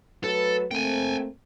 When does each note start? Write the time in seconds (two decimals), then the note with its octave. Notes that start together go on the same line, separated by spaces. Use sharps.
0.24 F#3 A3 A4 B4
0.71 A3 A#3 C4 G5 G#5